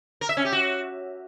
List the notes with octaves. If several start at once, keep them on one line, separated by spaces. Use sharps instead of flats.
A#4
E5
C#4
G4
F#4